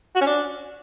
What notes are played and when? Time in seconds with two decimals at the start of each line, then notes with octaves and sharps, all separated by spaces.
0.15 F#4
0.21 C#4
0.27 D4